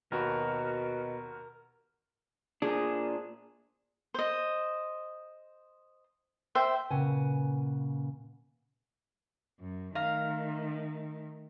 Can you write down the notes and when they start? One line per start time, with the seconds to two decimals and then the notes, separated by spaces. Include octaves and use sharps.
0.12 D#2 B2 F#4 A#4 B5
2.62 A#2 D4 G#4
4.14 C5 D#5
6.55 C5 E5 G5
6.90 A#2 C#3 B4 F#5 G#5
9.61 F#2
9.95 D#3 A3 F5 A#5